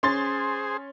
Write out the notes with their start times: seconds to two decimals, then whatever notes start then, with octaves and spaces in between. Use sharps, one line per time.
0.03 C#4 G#4 C5 C6 A6